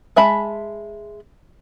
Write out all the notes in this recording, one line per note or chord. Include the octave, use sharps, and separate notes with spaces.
G#3 E5 A5 B5